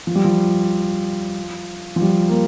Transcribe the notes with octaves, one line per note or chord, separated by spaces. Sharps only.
F3
G3
F3
F3
G3
A#3